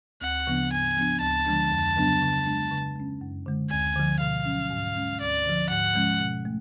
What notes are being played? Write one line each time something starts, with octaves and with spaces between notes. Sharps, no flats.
D2 F#5
C#3 F3 B3 D4
G#2 G#5
F3 B3 D4
D2 A5
D3 F3 G#3 D4
F2
C#3 F#3 B3 D4
C#3
G#3 D4
C#3
G#3 C#4
F#2
D3 G#3
D2 G#5
D3 F3
B2 F5
F#3 C#4
G#2
G#3 C#4
D2 D5
D3 F3
G#2 F#5
F3 G#3 C#4
B2
A3